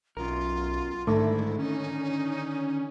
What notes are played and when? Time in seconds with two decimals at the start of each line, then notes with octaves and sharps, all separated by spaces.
0.17 B1 F#2 F4 A#4
1.07 G#2 D3 D#3 A3 E4
1.59 C#4 D#4